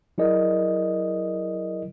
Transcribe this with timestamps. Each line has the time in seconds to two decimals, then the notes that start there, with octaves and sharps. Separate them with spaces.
0.18 F#3 E4 G#4 A#4 D5 D#5